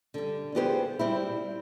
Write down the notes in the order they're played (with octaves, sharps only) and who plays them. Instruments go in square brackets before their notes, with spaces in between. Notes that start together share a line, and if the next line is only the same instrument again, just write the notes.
[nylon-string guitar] D3 G3
B3 F4 G4 G#4 B4 C5
G3 C4 E4